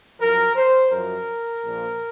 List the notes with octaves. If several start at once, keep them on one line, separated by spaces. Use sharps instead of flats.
F#2 F3 A#4
C5
F#2 F3 A#4
A#1 A#2 F3